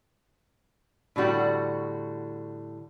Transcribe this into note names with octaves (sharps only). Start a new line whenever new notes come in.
A2 D3 G3 F#4